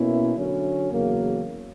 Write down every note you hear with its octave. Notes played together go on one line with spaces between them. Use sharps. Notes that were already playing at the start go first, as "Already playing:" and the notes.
Already playing: B2 A#3 C#4 E4
D3 F#3 C#4
E2 C#3 F#3 A#3